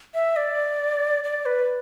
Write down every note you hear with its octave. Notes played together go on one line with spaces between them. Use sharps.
E5
D5
D5
B4